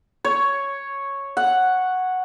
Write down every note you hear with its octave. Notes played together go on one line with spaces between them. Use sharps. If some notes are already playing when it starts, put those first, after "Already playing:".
C#5
F#5